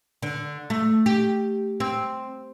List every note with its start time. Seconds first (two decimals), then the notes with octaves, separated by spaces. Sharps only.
0.22 D3
0.70 A3
1.06 G4
1.80 C4